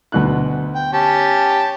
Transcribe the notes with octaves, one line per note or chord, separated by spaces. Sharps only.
D2 B2 F#6
G5
C#4 G4 A5